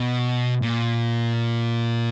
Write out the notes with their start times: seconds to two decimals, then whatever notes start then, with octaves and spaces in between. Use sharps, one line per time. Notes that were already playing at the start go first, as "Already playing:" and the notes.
Already playing: B2
0.62 A#2